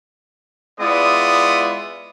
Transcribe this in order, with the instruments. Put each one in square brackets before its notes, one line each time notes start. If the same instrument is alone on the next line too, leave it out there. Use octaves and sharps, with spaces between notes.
[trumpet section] G#3 B3 E4 F4 D5 D#6